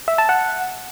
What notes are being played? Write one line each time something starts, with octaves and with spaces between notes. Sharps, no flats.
E5
A5
F#5